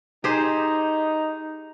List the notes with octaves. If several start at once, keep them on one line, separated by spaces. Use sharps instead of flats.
D#4 G4 G#4 C5